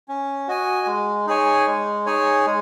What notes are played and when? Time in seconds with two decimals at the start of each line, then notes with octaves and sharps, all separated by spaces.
0.08 C#4
0.48 F#4 D#5 G#5
0.86 G#3
1.27 D#4 G#4 C#5 G#5
1.66 G#3
2.06 D#4 G#4 C#5 G#5
2.46 G#3